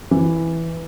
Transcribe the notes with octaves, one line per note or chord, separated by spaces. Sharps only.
E3